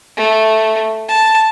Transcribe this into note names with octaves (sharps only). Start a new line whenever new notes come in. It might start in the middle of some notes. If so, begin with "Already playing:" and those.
A3
A5